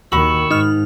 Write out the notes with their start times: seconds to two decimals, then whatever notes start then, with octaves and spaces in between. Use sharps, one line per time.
0.12 D#2 D#3 F#4 B5 C#6 E6 F#7
0.51 G#2 D#4 F6